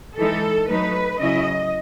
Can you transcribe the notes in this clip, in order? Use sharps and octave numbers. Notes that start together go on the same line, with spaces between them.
E3 G#3 D#4 A4
F#3 A3 D#4 B4
C#3 F#3 C#4 E4 D#5